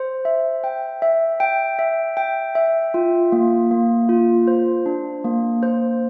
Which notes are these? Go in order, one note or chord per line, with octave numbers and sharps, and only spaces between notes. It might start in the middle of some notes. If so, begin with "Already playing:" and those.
Already playing: C5
E5
G5
E5
G5
E5
G5
E5
F4
A#3
A#3
F4
C5
D4
A#3
C5